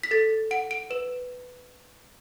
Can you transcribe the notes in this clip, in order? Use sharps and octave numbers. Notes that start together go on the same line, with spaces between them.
B6
A4 A6
F#5 D7
D7
B4 E7